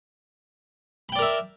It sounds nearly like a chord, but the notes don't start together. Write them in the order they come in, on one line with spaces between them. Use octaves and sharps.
B5 G5 D5 A#4 E5